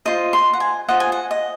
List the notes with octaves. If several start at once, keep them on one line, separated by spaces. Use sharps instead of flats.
F4 C5 D#5 C6
C6
F#5
G#5
F4 C5 D#5 F#5
G#5
F#5
D#5